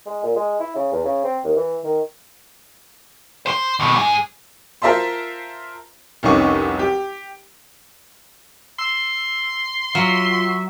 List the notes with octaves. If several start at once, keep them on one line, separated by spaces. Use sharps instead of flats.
G#3
A#2
G#3
E4
C#3
E2
C#3
C4
D#2
E3
D#3
C5 C6
D#2 B2
G#2 G#4
F4 A#4 C5 E5 A5 C6
F1 C2 C#4 D#4 C#6 D6
G4
C6 E6
F#3 F4 E5